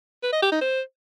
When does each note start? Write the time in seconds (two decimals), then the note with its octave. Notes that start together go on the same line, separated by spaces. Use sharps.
0.23 B4
0.32 D#5
0.42 G4
0.52 D#4
0.61 C5